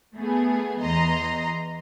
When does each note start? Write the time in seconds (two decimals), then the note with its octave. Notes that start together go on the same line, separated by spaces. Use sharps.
0.15 A3 B3 G#4
0.82 E2 E3 D#5 A#5 C6